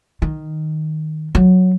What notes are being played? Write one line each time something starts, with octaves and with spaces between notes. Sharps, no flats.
D#3
F#3